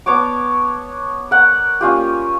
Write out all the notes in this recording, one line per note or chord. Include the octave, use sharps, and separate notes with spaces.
B3 C#5 A5 D6
A#4 F#5
A#3 C#4 F4 G4